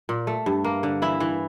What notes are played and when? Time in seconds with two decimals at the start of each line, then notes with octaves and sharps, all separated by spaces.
0.09 A#2
0.27 A3
0.46 G2
0.64 A#3
0.83 D3
1.02 E3 E4
1.20 E3